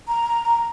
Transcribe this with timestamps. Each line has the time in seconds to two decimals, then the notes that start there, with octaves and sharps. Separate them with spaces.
0.08 A#5